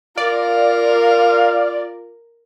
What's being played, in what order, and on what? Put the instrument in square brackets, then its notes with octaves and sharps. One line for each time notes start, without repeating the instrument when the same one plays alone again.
[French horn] F4 [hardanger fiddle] A#4 [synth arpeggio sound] D5 [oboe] F5